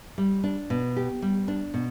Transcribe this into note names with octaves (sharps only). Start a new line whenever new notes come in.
G3
D4
B2
G4
G3
D4
B2